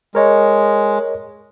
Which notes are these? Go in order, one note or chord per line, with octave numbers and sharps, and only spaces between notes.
G#3 A#4 C#5 D#5